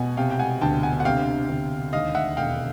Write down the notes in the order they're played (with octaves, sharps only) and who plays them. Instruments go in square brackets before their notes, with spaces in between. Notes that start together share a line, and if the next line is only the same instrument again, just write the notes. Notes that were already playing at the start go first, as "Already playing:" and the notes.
Already playing: [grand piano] B2 [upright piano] F#5 G#5
[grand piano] C3 [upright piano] F5 G5
[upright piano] G5
F#5 G#5
[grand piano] D2 [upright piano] G5 A5
[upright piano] F#5 G#5
F#5
[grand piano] C3 [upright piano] F5 G5
[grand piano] D2
[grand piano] D#2 [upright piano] D#5 F5
[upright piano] E5 F#5
[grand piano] E1 [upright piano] F5 G5